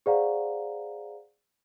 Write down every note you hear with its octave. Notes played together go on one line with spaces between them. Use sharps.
G#4 C5 D5 F5 F#5 A#5